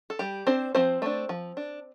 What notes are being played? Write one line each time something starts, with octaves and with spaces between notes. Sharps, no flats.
A4
G3 G4
C4 D4 C5
F3 C4 C5
A3 D4
F3
D4